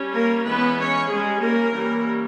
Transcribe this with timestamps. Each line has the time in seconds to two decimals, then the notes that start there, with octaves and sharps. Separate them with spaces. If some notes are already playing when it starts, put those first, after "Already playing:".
Already playing: G3 C#4
0.14 A#3 A#4
0.46 E3 G#3 B3 C#4 B4
0.78 C#4 C#5
1.10 G3 G#3 C#4 G#4
1.42 A#3 A#4
1.74 E3 G3 A#3 C#4